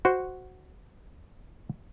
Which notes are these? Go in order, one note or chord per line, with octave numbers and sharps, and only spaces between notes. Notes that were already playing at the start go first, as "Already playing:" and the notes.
F#4 C5